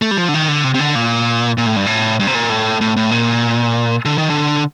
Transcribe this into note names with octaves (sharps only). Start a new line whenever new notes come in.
A3
G3
F3
D3
D#3
D3
C3
C3
D3
A#2
A#2
A2
G2
A2
G2
C3
A#2
A2
A2
A2
A#2
D3
D#3
D3